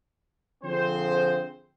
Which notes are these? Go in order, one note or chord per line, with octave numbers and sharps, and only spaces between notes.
D3 F3 C4 G#4 C5